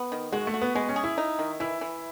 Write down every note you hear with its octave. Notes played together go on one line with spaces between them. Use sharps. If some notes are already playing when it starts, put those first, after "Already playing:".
Already playing: B3
D#3
G#3 F#4
A3
F#4
B3
G#3 B3
C#4
G#4
E4
D#4
D#3
E3 E4
E3